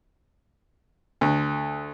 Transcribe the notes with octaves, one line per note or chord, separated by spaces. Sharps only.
D2